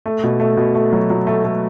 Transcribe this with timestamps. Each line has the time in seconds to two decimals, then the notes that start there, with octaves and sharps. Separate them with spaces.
0.06 A3
0.23 B2
0.40 A3
0.57 B2
0.75 A3
0.92 F#3
1.10 F#3
1.27 A3
1.44 A3